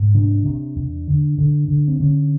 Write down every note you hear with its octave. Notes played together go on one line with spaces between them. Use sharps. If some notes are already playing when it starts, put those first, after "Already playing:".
Already playing: G#2
C3 D4
C3
E2
D3
D3
D3
C4
D3 C#4